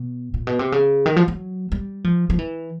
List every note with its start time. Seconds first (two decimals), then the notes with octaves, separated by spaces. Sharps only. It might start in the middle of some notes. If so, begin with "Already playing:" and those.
Already playing: B2
0.34 A#2
0.47 B2
0.59 C3
0.72 C#3
1.06 D#3
1.16 F3
1.28 F#3
1.72 G3
2.04 F3
2.30 F3
2.39 E3